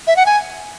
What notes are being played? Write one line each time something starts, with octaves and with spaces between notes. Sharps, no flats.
E5
F#5
G#5